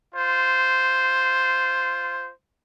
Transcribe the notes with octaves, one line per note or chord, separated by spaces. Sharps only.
F4 C5